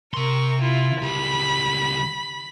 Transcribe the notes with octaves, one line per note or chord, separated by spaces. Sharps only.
C3 A#4 C6 C#6
E4 F4
C#2 G3 B5